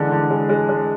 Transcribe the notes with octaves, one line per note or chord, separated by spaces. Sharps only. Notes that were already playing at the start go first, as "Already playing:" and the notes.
Already playing: D3 E3 G#3
D3
G#3
G#3
G#3